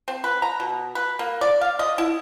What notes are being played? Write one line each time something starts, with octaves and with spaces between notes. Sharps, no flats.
C4
B4
A#5
B2
B4
A#3
D5
F5
D#5
E4